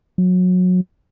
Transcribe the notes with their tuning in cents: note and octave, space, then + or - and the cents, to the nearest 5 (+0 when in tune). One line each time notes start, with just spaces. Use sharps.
F#3 -25